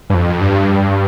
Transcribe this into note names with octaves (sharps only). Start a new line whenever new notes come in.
G2
F2
G2